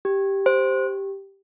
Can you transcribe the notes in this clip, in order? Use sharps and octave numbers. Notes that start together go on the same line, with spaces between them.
G4
C5